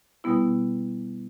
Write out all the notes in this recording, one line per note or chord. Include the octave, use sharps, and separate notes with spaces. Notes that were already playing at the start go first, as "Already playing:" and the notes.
B2 G3 B3 E4